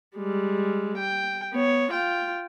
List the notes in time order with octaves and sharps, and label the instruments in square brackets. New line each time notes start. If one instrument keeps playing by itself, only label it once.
[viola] G3 G#3
G5
B3 C#5
F4 G5